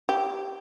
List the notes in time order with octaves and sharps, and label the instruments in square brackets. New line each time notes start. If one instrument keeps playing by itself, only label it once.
[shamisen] G4